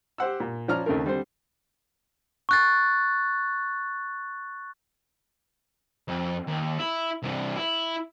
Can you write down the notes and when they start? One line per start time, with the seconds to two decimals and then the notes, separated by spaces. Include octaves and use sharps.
0.18 G4 C5 F#5 E6
0.40 A#2
0.68 F3 C#4 D5 A#5 F6
0.86 D#2 C#3 A3 C4 A#4
1.04 D3 G3 C4 C5
2.49 C#6 F#6 A6
6.08 F2
6.47 D#2
6.79 E4
7.23 C2 E3
7.56 E4